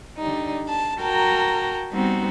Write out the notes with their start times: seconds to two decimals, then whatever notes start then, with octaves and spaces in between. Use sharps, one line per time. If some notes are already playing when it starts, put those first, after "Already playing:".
0.18 D3 G3 D#4
0.68 A5
1.01 F#4 A#4 G5 A5 A#5
1.91 G3 B3 C4 D#4 F#4